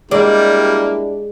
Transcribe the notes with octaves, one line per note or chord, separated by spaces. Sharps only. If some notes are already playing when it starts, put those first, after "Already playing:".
G3 G#3 A#3 D4 E4 G4 D5